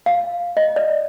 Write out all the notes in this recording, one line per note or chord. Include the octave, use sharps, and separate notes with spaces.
F5
D#5
D5